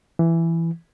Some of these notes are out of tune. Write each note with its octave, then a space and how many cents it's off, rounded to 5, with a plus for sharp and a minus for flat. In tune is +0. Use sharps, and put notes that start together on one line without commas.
E3 +10